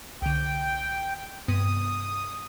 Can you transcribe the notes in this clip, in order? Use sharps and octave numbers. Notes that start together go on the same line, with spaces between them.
C2 D3 G5
G2 C3 B3 D#6